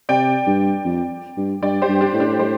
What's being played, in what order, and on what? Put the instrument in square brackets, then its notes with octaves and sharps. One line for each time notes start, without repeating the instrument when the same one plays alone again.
[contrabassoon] C3 [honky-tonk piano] D5 G5
[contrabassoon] G2
F2
G2
[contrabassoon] G2 [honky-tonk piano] D5 G5
[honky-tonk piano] G4 C5
[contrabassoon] G2
[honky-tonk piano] D4 G4
[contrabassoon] A2
[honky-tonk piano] D4 G4
G4 C5